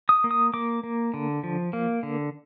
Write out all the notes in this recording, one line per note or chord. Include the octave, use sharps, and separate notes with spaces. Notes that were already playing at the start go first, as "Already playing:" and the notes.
D#6
A#3
D#6
A#3 D6
A#3
D3
F3
A#3
D3